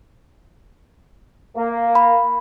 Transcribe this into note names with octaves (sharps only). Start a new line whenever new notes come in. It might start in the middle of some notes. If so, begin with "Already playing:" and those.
A#3
B5